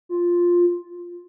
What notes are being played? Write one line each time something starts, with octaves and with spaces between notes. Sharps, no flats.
F4